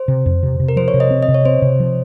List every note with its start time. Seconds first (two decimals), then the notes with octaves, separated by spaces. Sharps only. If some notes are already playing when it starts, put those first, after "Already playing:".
Already playing: C5
0.08 C3
0.26 F2
0.43 C3
0.60 C3
0.69 A#4
0.76 F3 C5
0.88 C#5
0.94 C3
1.00 D#5
1.11 C4
1.23 D#5
1.28 C3
1.34 C#5
1.45 C4 C5
1.62 C3
1.80 F3